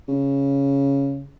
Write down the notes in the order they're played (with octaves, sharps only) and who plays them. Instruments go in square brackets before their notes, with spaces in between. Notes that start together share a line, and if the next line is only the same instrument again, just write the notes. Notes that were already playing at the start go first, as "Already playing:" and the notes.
[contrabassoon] C#3